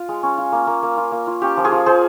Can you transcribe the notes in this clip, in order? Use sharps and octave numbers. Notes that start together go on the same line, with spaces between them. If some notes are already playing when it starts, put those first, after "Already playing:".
Already playing: F4
G#3
C#4
F4
A#3
A#3
A#3
F4
A#3
F4
C#4 G4
F3
F4 G#4
F3
F3 G#4 C5